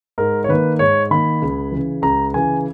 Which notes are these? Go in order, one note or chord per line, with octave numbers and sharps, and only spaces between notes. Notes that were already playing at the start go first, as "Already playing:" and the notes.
G#2 A#4
C#5
D#3 A#3 B4
G#2 C#5
D#3 A#3 B5
C#2
C#3 E3
C#2 A#5
C#3 E3 G#5